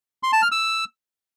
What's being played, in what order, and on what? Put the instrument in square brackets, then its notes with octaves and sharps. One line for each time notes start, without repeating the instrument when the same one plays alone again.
[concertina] C6
A5
F6
E6